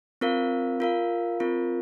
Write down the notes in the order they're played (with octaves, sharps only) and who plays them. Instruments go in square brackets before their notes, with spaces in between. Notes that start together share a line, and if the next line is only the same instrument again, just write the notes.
[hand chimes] C4 F4 A#4 F5
F4 A#4 F5
C4 F4 A#4